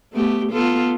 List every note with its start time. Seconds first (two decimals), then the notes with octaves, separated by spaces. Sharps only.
0.12 A3 B3 G4
0.52 B3 F4 A4